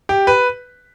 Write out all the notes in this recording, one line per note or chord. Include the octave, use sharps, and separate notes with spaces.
G4
B4